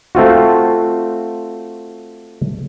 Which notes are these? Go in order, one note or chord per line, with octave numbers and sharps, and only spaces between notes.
A3 C4 F4 F#4